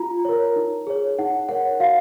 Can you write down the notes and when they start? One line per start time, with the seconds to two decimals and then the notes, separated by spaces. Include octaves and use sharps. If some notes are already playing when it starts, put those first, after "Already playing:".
Already playing: F4 A#5
0.25 A#4 C#5
0.56 D#4
0.87 G#4 C#5
1.19 D#4 F#5
1.49 A#4 C#5 F#5
1.80 F#4 F5